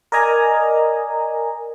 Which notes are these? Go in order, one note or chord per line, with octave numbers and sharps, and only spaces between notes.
A#4 D5 D#5 G#5 A#5